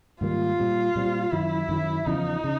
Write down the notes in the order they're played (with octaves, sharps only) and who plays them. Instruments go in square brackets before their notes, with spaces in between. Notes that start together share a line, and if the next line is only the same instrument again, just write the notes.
[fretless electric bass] G#2 D#3 G3 A#3 [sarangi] F4
[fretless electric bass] A#2 G3 C4
A#2 G3 C4
[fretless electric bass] F#2 D#3 F#3 [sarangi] E4
[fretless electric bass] F#2 D#3 F#3
[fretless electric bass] E2 C#3 F3 [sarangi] D#4
[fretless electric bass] C#3